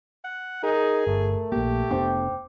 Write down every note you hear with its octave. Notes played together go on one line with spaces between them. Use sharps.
F#5
D#4 G#4 A#4
G1 A3
A#1 A#3 G4
F1 B3 D4 C5 G5 D6